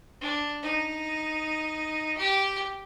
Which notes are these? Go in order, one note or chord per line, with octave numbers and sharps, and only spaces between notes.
D4
D#4
G4